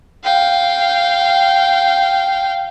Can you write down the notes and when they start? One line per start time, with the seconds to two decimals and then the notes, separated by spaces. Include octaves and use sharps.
0.24 F5 G5